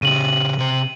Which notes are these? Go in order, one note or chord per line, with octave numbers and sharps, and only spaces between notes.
C#3 G4 D#7 F#7
C3 C5